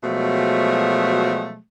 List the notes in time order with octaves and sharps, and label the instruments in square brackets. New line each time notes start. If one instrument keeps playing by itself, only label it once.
[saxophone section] B2 F3 F#3 G#3 A3